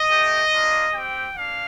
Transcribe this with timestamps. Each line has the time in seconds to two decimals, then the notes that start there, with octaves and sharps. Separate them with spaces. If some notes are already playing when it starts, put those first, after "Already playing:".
Already playing: D#5
0.09 A3 D#4 G4
0.52 A#3 D4 F4
0.93 C4 G4 G5
1.36 A#3 D4 F5